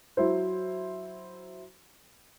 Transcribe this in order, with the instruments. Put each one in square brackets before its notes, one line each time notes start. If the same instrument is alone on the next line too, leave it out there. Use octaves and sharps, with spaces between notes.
[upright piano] F#3 E4 C5